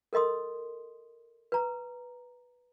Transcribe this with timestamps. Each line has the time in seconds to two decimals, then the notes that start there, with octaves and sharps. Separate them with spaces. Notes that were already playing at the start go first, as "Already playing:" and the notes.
0.13 A4 A#4 D#5 C6 D#6
1.52 B4 A#5